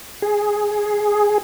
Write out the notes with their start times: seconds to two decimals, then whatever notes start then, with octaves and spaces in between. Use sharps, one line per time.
0.22 G#4